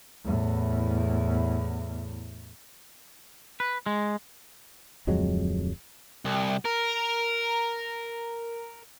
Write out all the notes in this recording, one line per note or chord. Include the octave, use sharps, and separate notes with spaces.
E2 A2
B4
G#3
D1 F2 F#3 G#3
C2
A#4